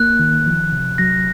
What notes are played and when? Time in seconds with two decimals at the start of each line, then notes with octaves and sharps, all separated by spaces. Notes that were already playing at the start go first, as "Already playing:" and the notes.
Already playing: A#3 F#6
0.19 D#3
0.46 F3
0.72 C3
0.98 F#3 A#6